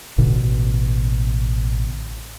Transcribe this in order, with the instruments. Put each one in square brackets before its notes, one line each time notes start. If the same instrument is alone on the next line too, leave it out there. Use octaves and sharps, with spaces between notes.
[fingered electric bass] A1 B2 D3